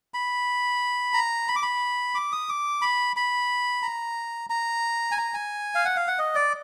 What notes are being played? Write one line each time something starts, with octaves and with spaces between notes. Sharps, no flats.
B5
A#5
B5
D6
B5
D6
D#6
D6
B5
B5
A#5
A#5
G#5
A#5
G#5
F5
F#5
F5
F#5
D#5
D5